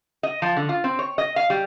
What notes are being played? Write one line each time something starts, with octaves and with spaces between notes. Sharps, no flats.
D#5
F3
D3
F4
C4
C#5
D#5
F5
G3